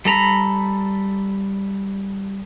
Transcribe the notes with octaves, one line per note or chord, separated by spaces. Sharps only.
G3 A4 A#5 B5